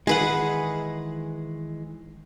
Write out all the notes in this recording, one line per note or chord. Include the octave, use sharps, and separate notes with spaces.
D#3 E3 G#3 G#4 B4 F#5